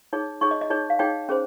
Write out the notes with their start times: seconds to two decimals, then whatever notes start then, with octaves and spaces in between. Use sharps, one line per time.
0.13 D#4 G#4 C#5
0.41 D#4 G#4 C#5 C#6
0.51 D#5
0.61 D#5
0.70 D#4 G#4 C#5
0.90 F5
0.99 D#4 G#4 C#5 G5
1.29 C#4 G#4 C5